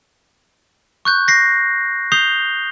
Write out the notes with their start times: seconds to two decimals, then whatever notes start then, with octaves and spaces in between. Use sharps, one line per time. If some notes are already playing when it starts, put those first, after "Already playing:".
1.05 C#6 F#6 G6
1.28 A#6 C7
2.12 D#6 G6 C7 F7 G7